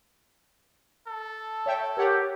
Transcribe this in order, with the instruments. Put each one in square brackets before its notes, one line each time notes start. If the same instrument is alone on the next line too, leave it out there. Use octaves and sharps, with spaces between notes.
[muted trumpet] A4
[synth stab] C#5 E5 G5
[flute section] G4 [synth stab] A#4 C#5 F#5